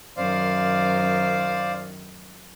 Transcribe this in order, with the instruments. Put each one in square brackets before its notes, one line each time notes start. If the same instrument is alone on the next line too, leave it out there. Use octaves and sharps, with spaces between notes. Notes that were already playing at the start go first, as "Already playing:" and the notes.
[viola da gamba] F#2 D#3 [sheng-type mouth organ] C5 D5 F5